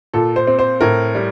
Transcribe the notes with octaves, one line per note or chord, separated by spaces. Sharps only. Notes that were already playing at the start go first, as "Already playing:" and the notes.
A#2 A4
C5
C4
C5
A2 A#4
G3